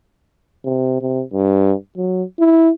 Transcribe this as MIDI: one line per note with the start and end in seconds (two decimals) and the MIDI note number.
0.65 1.00 48
1.01 1.23 48
1.33 1.74 43
1.97 2.23 54
2.39 2.71 64